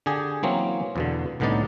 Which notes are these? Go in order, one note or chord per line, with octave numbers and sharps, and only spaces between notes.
D3 G4 G#4 G#5
E3 F#3 A#3 C4 C#4
E2 B2 D3
C2 A2 D3 B3 D#4 D5